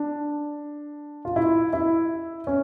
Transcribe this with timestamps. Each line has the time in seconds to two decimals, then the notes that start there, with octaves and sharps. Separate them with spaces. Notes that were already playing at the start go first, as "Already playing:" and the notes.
Already playing: D4
1.25 F4
1.36 E4
1.73 E4
2.47 C#4